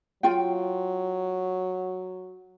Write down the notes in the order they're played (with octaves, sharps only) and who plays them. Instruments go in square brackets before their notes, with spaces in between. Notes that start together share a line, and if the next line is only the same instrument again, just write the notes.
[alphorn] F#3 [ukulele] F4 G5